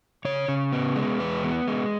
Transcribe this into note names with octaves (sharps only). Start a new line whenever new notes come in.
C#3 C#5
C#3
B3
G#3
E2 B4
B3
G#3